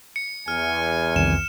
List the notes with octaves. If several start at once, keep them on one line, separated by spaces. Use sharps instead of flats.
C#7
E2 G#5 F6
C2 F2 D#3 E7